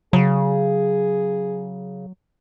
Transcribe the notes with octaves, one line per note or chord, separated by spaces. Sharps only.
C#3 F#3 G#4